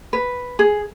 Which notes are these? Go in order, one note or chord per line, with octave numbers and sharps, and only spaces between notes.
B4
G#4